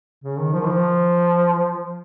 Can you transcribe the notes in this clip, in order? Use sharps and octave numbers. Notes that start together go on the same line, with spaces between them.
C#3
D#3
F3
D#3
F3